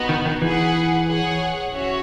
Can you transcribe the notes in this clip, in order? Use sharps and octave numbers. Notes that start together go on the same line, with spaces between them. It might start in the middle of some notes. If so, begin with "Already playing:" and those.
Already playing: B3 D#4 F#4
D#3
D#3
E3 G#4 B4 F#5
G#4 C#5 F#5
C#4 F#4 C#5 E5